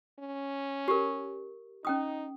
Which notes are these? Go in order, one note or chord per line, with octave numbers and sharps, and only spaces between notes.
C#4
G4 A#4
C#4 D#4 G5 D#6